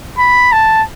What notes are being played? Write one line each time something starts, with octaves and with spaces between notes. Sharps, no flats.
B5
A5